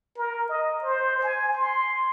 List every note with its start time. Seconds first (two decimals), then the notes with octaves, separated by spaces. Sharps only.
0.17 A#4
0.49 D#5
0.83 C5
1.23 G#5
1.55 C6